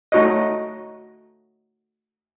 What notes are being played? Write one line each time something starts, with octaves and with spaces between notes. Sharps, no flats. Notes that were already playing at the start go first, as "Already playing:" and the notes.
A3 D#4 F#4 C#5 D#5